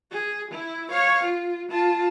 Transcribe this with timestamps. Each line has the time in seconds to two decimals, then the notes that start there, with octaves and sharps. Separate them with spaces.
0.12 G#4
0.51 E4
0.91 C#5 F5
1.24 F4
1.69 F4 A5